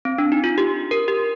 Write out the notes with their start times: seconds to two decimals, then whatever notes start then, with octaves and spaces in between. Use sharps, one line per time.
0.05 C4
0.18 D4
0.32 D#4
0.44 F4
0.58 G4
0.91 A#4
1.08 G4